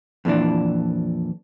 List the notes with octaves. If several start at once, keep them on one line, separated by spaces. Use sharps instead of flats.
F2 A#2 E3 D4